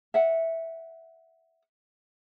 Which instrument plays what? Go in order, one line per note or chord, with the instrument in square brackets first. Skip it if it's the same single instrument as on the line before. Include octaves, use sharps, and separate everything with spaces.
[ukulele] E5 F#5